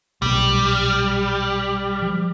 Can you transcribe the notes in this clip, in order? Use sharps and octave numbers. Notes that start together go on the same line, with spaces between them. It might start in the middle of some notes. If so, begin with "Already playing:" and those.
B1 A#2 G3
F3